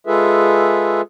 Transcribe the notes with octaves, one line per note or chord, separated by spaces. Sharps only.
G#3 F4 G#4 A4 B4 E5